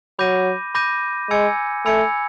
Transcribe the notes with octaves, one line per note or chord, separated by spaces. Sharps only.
F#3 B5 D6 G6 A#6 D#7
B5 D6 G6 A#6 D#7
G#3 G#5 B5 E6 G#6 C#7
A3 G#5 B5 E6 G#6 C#7